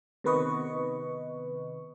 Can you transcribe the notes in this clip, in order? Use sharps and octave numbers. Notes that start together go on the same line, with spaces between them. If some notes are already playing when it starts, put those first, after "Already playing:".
C3 D#3 B3 B4 D#5 C#6